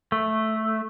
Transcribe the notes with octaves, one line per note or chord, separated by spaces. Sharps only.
A3